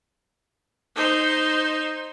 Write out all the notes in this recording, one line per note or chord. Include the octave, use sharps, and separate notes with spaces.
D#4 C5